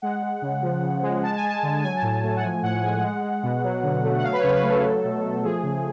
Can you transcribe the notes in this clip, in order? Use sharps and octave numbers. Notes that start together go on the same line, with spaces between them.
G#3 F#5
G#3
C#3
F3
C#3
G#3
G#3 A5
G#5
G#3
A5
D3
F#3 G#5
A5
A2
G#5
A3
F#5
F3 G#5
A2 F#5
G#3 G#5
G#3 F#5
G#3
B2
F#3
D3
A3
F#5
F#3 F5
B4
C#3 C#5
B4
A3
A4
F#3
B2
A3
F3 G#4
C#3